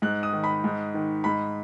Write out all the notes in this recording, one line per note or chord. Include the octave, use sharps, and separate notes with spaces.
G#2 F#6
D#6
D#3
B5
G#2
D#3
G#2 B5